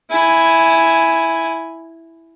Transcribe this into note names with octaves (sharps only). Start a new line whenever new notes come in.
E4 G#5